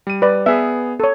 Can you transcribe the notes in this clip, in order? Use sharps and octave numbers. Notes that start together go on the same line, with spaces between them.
G3 D#7
B4 D5
B3 G#4 E5
A4 C#5